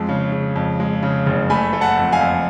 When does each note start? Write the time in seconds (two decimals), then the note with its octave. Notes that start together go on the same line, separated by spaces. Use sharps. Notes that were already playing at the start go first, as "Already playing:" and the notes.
Already playing: F2 G#3
0.09 C#3
0.32 C#3
0.56 F2
0.80 G#3
1.03 C#3
1.26 F#1
1.50 A3 G#5 B5
1.73 A3
1.81 F#5 A5
1.97 F2
2.12 F5 G#5
2.21 F2